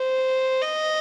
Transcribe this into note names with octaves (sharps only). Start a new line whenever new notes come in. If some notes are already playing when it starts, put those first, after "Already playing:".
Already playing: C5
D#5